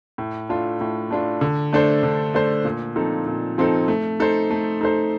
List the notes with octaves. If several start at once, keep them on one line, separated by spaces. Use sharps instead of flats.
A2
A3 D4 F4
A2
A3 D4 F4
D3
A3 D4 A4 C5
D3
A3 D4 A4 C5
A#2
F3 C4 D#4 A4
A#2
F3 C4 D#4 A4
A3
D#4 A4 C5
A3
D#4 A4 C5